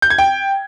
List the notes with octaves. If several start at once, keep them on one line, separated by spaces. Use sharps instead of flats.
G6
G#6
G5